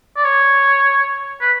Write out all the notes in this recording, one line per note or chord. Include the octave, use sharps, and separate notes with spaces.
D5
C#5
B4